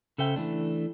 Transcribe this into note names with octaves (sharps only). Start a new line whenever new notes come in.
C#3 A4 C5 E5 G5
E3 A3 D4